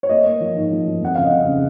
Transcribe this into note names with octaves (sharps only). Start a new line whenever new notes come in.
C#5
A#3 D#5
A#3
F3
G#2
F3
F3
F2 F#5
C#3 F5
D#5
C#3
C#3